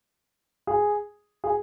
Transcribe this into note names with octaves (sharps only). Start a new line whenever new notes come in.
G#4
G#4